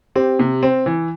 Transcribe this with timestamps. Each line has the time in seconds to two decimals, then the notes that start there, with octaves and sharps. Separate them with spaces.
0.16 C4 G4
0.39 C3
0.63 C4
0.86 E3